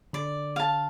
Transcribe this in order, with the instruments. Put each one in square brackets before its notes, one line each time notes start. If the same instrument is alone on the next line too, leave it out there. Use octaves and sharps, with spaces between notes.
[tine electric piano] D3 [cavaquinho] D5
[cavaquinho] F5 A5